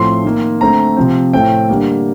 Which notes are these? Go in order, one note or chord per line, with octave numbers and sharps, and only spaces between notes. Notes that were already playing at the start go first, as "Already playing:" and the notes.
Already playing: A2 F3 A3 C4 C6
D#3 A#3
D3 A3 C4 A#5
C3 F3 C4
A2 A3 C4 G5
D3 G3 A#3